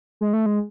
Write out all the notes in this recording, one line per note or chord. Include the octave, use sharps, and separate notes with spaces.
G#3
A3
G#3